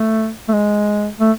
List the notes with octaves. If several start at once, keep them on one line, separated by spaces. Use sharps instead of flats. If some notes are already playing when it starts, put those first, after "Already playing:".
Already playing: A3
A3
G#3
A3